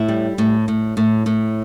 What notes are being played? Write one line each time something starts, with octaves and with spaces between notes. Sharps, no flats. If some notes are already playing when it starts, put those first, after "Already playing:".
Already playing: A2 E4
G3
A2
A2
A2
A2